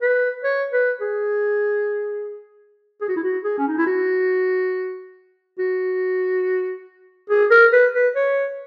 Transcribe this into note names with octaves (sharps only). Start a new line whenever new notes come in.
B4
C#5
B4
G#4
G#4
F#4
E4
F#4
G#4
C#4
D#4
E4
F#4
F#4
G#4
A#4
B4
B4
C#5